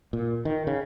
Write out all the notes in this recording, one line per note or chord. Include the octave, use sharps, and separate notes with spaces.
A#2
D#3
C#3